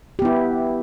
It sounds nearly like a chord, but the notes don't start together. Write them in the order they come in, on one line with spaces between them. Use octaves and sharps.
G4 B3 E4